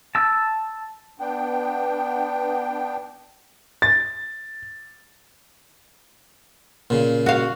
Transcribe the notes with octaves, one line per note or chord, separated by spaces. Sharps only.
A5 E6
B3 D4 G5
A6
A#2 C#3
F#4 F5